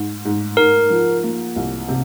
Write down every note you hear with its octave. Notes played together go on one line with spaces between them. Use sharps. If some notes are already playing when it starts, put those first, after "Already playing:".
Already playing: G#2
G#2
G#2 A#4
F3
A#3
C2
C3